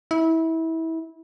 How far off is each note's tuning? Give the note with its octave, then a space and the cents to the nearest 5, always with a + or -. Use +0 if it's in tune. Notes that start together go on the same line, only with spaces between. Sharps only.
E4 -25